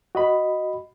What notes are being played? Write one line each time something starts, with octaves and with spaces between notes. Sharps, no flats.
F#4 D#5 B5